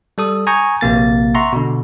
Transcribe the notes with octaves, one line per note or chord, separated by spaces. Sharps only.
G3 A4 D#6
G#5 A#5 C#6 D#6 G6
A#1 C3 A#3 A6
E5 F#5 A#5 C6 C#6
B2 D3